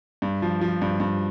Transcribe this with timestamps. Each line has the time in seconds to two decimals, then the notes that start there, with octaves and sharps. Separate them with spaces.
0.22 G2
0.42 F3
0.61 F3
0.82 G2
1.00 G2